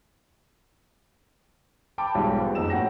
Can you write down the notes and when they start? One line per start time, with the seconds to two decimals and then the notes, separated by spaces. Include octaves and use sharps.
1.98 G5 A5 B5 D6 D7
2.15 B1 F3 G3 G#3
2.41 B3
2.55 F#1 F2 D#4 E6 E7
2.70 A2 F#4 F#5 G5 A#6